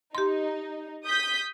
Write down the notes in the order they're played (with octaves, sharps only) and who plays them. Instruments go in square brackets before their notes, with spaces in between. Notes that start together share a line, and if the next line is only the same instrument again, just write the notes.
[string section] D#4 [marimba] G4 C6
[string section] D#6 G6 B6